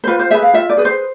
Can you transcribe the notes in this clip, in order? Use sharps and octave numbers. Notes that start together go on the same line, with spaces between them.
C5
F4 B4
C5
G#4 B4 E5
F5
F4 E5
D5
G#4 B4
C5